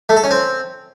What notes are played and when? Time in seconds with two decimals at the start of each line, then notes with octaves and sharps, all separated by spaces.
0.09 A3
0.16 A4
0.24 C#4
0.31 C4